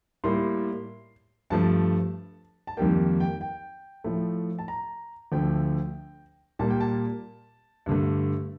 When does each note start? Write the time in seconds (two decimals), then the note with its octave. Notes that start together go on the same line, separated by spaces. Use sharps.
0.24 A2 G3 A#3 C6
1.50 G2 F3 A3 A5
2.67 A5
2.77 F2 D#3 G3 A#3 G5
3.20 G5
3.41 G5
4.04 A2 F3 A3
4.59 A5
4.68 A#5
5.32 D2 D3 F3 A3 G5
6.59 A#2 G3 A#3 A5
6.70 G5
6.80 A5
7.86 G2 D3 A3